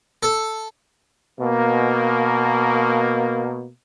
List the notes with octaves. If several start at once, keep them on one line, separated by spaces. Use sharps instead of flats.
A4
B2 A#3